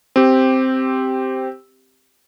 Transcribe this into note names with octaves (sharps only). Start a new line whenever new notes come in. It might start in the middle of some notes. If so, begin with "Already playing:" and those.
C4 G4